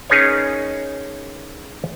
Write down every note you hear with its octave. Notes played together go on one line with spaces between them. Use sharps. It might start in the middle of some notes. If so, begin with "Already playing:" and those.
C#4 D#4 G#4 A#4 B4 C#5